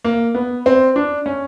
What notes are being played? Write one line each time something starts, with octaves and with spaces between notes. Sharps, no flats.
A#3
B3
C4
D4
C#4